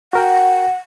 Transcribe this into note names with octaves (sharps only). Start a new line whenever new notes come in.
F#4 A#4 F#5 G5